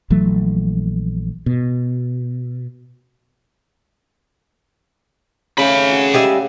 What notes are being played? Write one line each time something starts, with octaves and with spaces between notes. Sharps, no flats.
A#1 E3 F#3 A3
B2
C#3 A3 G#4 B5
F#4
G3 G#3 E5